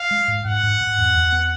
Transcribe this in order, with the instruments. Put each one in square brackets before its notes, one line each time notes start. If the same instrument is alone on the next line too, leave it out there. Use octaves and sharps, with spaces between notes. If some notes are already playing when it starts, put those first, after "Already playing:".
Already playing: [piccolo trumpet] F5
[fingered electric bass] G#3
G#2
[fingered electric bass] G#2 [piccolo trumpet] F#5
[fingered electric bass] G#2
G#2
E2
E2
B3